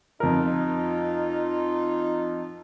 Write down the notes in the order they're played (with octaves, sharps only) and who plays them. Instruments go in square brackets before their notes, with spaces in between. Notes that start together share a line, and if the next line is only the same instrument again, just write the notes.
[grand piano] F2 A#4 [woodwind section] D#4 F4